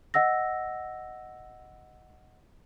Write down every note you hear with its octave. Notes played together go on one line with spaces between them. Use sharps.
D#5 F#5 E6 A#6